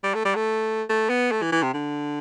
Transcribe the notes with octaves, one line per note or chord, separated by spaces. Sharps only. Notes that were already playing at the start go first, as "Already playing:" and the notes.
G3
A3
G3
A3
A3
B3
A3
E3
E3
C3
D3